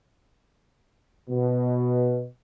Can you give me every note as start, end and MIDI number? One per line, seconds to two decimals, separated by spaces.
1.29 2.25 47